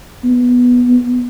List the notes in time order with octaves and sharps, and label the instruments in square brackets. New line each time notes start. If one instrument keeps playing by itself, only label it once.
[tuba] B3